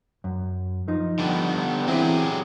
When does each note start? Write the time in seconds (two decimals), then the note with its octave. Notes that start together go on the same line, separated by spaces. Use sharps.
0.24 F#2
0.88 F3 D#4
1.19 D3 G3 B3
1.87 E3 F#3 C4 E4 G4 G#4